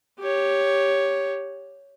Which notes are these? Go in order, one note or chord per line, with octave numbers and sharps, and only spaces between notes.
G4 C#5